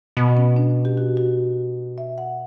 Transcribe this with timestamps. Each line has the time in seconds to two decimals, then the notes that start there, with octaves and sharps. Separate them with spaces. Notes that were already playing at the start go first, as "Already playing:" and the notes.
0.17 B2 B3
0.37 C#4
0.56 D4
0.85 G4
0.97 F#4
1.17 F#4
1.98 E5
2.18 F#5